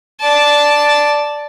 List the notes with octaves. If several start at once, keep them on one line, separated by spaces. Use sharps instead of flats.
D5 A5